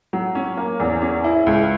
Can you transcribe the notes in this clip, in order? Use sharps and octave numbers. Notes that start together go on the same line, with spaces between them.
F#3
C#4
A#3
E2
C#4
E4
C#2